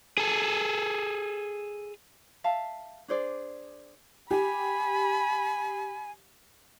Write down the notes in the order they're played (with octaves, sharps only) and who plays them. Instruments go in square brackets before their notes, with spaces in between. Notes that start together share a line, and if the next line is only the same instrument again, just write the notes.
[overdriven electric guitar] G#4 A4
[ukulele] E5 F5 A5
D4 G#4 C5 D5
[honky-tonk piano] G4 [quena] G#5 [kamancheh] B5